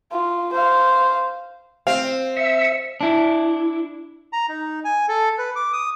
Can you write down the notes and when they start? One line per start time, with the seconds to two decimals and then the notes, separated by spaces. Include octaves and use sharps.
0.12 F4
0.52 C5 F5
1.87 C4 F5
2.37 E5 C#7
3.01 D4 E4
4.32 A#5
4.49 D#4
4.84 G#5
5.08 A4
5.38 B4
5.56 D6
5.73 D#6